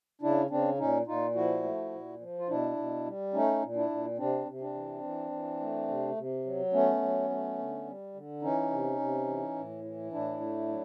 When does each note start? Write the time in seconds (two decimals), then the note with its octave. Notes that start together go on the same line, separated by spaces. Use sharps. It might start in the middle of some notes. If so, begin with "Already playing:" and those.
0.22 C#3 D4 E4
0.50 C#3 C4 D4
0.78 A#2 C#4 D#4
1.07 A#2 D#4 F4
1.35 F3 E4 F#4
1.63 A3
1.92 A#2
2.20 F3
2.39 F4
2.48 B2 D4 E4
2.77 B2
3.05 G3
3.33 A3 C#4 D#4
3.62 A#2
3.76 D4 E4
3.90 A#2
4.18 C3 C4 D4
4.47 C3
4.61 C4 D4
4.74 E3
5.03 E3
5.31 E3
5.60 A3
5.88 C3
6.16 C3
6.45 F#3
6.73 A3 B3 C#4
7.02 F#3
7.30 A3
7.58 D3
7.85 G3
8.14 D3
8.42 E3 C#4 D#4
8.70 C3
8.99 C3
9.27 E3
9.56 A2
9.84 E3
10.12 A2 D4 E4
10.40 A3
10.68 F#3